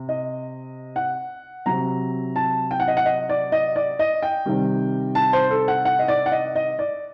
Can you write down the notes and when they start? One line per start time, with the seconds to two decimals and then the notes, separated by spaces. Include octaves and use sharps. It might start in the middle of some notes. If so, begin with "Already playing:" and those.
Already playing: C3
0.09 D#5
0.96 F#5
1.66 C3 F#3 A#5
2.36 A5
2.71 G5
2.80 F#5
2.88 D#5
2.97 F#5
3.06 D#5
3.29 D5
3.52 D#5
3.76 D5
3.99 D#5
4.23 G5
4.46 C3 D#3 G3
5.15 A5
5.33 C5
5.50 A4
5.68 F#5
5.85 F#5
5.99 D#5
6.08 D5
6.26 F#5
6.32 D#5
6.56 D#5
6.79 D5